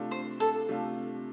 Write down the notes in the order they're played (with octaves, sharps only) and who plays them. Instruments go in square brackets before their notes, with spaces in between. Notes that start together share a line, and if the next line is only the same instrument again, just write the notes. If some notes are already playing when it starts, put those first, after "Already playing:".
Already playing: [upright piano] C3 A3 D4 F4
[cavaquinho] C5
A4
[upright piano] C3 A3 D4 F4